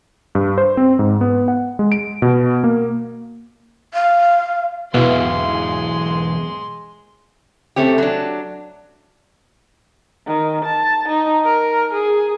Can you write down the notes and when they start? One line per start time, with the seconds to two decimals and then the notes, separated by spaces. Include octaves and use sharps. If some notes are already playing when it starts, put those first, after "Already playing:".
0.35 G2
0.58 C5
0.77 C4
0.99 G#2
1.21 B3
1.48 F#5
1.79 G#3
1.92 D7
2.22 B2
2.64 A#3
3.94 F5
4.94 B1 E2 B2 G#3 E4 E5 F5 C6
7.76 A3 C4 C#4 G4
7.98 F#3 D4
10.27 D#3
10.65 A5
11.08 D#4
11.44 A#4
11.93 G#4